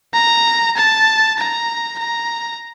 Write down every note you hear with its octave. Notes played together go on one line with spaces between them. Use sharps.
A#5
A5
A#5
A#5